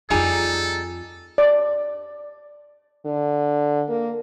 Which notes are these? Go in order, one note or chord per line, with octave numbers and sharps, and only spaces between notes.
F2 G3 D#4 F4 G#4 A4
D5
D3
A#3